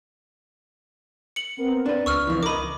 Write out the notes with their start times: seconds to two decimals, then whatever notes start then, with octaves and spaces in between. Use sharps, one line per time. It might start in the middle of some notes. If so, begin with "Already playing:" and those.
1.36 C#7 F#7
1.57 B3 C4 A#4
1.86 D4 B4
2.06 C#2 C#6 E6 F6
2.27 F2 E3
2.43 A#4 D#5 B5 D6